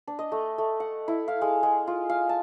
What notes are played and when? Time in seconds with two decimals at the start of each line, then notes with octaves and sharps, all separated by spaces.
0.07 D4
0.19 D#5
0.32 A3
0.58 A3
0.80 F#5
1.08 E4
1.28 F5
1.42 G#3
1.63 G#3
1.87 F4
2.09 F5
2.29 A5